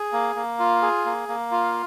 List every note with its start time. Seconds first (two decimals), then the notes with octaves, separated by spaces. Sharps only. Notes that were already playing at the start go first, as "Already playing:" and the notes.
Already playing: G#4
0.13 A#3
0.36 A#3
0.59 F4
0.82 G#4
1.05 A#3
1.29 A#3
1.51 F4